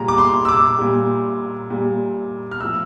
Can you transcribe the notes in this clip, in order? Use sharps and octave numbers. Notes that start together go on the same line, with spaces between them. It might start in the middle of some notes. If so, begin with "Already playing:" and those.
Already playing: A#2 G3 A#5
D6
C6
E6
D6
A#2 G3
A#2 G3
F6
A2 F3 E6